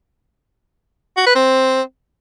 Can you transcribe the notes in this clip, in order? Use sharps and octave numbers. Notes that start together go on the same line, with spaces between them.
F#4
B4
C4